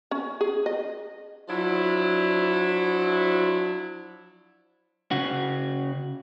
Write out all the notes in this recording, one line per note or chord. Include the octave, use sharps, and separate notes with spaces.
C#4
G#4
D#5
F3 F#3 D4 E4
C#3 F#4